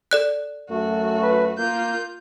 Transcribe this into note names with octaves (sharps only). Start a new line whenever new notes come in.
A4 D5 F#6
F#2 A3 F#4
B4
A#3 F4 G6